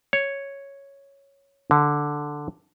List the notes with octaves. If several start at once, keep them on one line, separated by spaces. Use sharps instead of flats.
C#5
D3